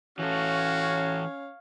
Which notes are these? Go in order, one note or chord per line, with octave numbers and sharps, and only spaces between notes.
E3 C#4 F#4 A4 C#5 F5